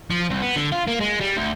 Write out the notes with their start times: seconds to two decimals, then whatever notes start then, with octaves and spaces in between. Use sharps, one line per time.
0.11 F3
0.30 C2
0.42 B3
0.56 D3
0.72 F4
0.87 A#3
1.01 G#3
1.21 G3
1.37 D2